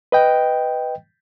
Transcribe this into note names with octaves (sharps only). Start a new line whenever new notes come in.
B4 D#5 G5